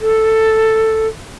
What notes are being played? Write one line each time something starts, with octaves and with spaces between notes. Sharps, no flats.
A4